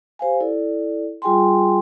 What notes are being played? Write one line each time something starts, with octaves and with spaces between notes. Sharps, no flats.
G4 C5 F5 G#5
E4 A4 D5
G3 F4 G#4 G5 G#5 C6